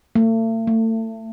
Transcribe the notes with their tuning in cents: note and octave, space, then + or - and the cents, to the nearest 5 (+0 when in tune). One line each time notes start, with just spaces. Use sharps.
A3 +40
A3 +30